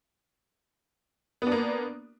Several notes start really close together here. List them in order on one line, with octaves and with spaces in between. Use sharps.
B3 D4 A#3